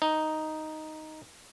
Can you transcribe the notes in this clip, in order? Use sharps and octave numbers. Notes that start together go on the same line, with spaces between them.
D#4